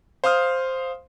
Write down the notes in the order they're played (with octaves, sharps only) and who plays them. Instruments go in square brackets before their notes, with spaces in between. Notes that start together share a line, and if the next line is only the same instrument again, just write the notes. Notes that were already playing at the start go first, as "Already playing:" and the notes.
[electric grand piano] C5 F5 C6 D#6 F6